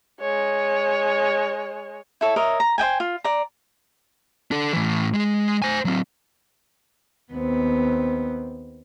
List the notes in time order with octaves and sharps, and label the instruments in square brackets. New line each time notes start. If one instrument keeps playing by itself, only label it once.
[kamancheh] G#3 C#5
[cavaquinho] E4 A4 C#5
A#4 C#5 D#5 E5
A#5
C5 D#5 G5 G#5
F4
D5 A#5
[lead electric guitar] D4 A4
A2 E3
G#3 G#4
C5 G#5
F#3 C4
[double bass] D#2 C4 [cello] B3